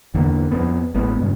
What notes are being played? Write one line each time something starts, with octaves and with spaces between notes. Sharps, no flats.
E2 D3 E3 A#3
F2 B3
A1 G#3 B3
G2 C#3